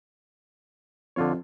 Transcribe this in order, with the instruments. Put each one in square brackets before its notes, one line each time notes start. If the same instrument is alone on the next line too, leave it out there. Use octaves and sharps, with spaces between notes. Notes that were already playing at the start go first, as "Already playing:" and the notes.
[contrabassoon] F2 [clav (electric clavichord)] D3 F4 C#5